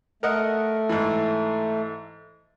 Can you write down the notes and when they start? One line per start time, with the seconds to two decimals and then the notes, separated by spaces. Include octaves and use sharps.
0.23 A3 A#4 D#5 F#5
0.89 G#2 E3